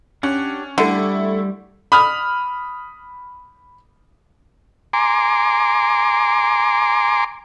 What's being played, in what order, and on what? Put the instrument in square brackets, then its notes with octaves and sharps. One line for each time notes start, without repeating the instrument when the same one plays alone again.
[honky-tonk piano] C#4 [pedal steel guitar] D4 G4 F#5
[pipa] D3 [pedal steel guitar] G3 G4 [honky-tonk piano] A3 E4
[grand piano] B5 D#6 F6
[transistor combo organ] G#5 A#5 C6 D6